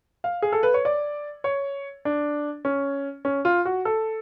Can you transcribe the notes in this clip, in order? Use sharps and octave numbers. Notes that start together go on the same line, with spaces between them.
F5
G#4
A4
B4
C#5
D5
C#5
D4
C#4
C#4
F4
F#4
A4